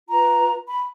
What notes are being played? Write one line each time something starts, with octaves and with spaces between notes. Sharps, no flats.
F4 B4 A#5
B5